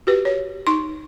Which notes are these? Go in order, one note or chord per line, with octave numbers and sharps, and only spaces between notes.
F#4 G4 B4
C#5
D#4 C6